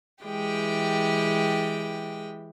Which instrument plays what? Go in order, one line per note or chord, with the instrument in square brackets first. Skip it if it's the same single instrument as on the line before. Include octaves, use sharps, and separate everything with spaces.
[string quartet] E3 G#3 G4 G5